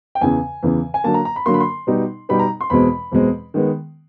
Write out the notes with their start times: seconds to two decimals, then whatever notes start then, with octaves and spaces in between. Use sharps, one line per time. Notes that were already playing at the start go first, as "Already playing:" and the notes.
0.15 G5
0.21 E2 C#3 E3 G#5
0.63 E2 C#3 E3
0.94 G#5
1.04 D3 F#3 A#3 A5
1.14 A#5
1.25 A#5
1.36 B5
1.46 D3 F#3 A#3 C6
1.54 B5
1.60 C6
1.87 B2 G3 B3 D#4
2.29 B2 G3 B3 D#4 B5
2.39 A#5
2.61 C6
2.70 E2 B2 G#3 C4 B5
3.12 E2 B2 G#3 C4
3.54 D#3 G#3 B3